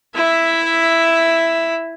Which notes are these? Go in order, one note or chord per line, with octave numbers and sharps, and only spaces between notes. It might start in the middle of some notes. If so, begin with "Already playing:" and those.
E4 E5